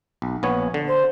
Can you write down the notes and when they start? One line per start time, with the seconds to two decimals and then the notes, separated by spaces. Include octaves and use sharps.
0.22 B1
0.43 A#1 B3 C#5
0.74 D3
0.87 C5